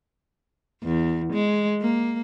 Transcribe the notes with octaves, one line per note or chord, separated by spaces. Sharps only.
E2
G#3
A#3